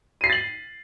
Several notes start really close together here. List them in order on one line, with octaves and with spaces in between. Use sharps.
D#7 C7 B6 A6 F#7